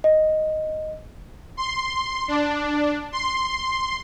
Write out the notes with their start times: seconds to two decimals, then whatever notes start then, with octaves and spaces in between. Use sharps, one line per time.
0.04 D#5
1.57 C6
2.28 D4
3.12 C6